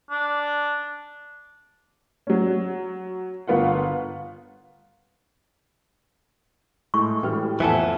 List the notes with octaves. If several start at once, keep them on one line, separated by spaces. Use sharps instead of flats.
D4
F#3 C#4
G1 B3 F4 F#5
A2 G#3 A3 C#6
A2 E3 G3 F6
F2 A2 E3 B3 A4 E5 G#5 A5